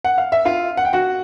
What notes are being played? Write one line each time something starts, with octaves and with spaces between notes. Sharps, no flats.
F#5
F5
E5
F4 F5
F#5
G5
F#4 F#5